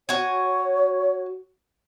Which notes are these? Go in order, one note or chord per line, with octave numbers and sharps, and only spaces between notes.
F#4 C#5 G#5